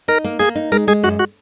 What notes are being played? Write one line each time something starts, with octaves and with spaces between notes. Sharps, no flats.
D#4 A#4
A#3
A#3 G#4
D#4
G#3 A#4
G#3 G#4
F#2 F#4
F#4